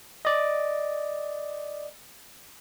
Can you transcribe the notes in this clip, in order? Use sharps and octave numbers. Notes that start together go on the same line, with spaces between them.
D5 D#5